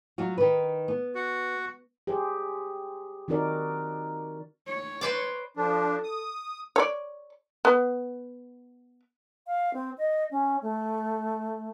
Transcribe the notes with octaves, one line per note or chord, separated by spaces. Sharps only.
F#3 F4 F#4
D#3 B4
B3
F#4
G4 G#4 C5
D#3 C4 D#4 F#4 A#4 D5
C#5
B4 C5 D5
F3 D4 A4
D#6
C#5 D5
B3
F5
C4
D#5
C#4
A3